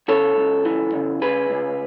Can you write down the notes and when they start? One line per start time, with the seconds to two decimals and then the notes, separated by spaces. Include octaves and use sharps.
0.08 C#3 A4 C#5
0.36 C#2
0.65 E3
0.94 C#3
1.22 C#3 G#4 B4
1.50 C#2